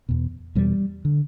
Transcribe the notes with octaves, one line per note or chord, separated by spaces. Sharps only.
E2 B2
E2 B2 G3
D3